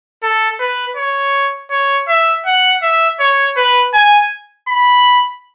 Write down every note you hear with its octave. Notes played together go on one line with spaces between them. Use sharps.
A4
B4
C#5
C#5
E5
F#5
E5
C#5
B4
G#5
B5